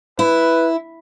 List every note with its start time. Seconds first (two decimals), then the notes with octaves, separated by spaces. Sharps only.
0.19 E4 B4